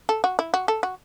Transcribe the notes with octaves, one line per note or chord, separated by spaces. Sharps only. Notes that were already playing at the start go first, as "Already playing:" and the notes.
A4
F#4
E4
F#4
A4
F#4